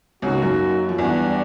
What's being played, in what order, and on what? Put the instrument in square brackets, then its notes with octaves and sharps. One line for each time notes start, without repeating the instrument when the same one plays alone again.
[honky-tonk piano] C#2 C#3 [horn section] A#3 D#4 F#4
[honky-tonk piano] F#2 F#3
F3
[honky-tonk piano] E2 E3 [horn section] G3 B3 D4 F#4